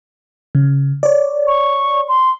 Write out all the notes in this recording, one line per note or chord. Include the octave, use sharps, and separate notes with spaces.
C#3
C#5 D5
C#6
C6